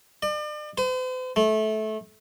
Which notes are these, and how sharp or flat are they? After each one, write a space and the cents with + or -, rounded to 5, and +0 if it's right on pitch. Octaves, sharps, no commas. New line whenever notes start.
D5 +40
C5 -45
A3 -20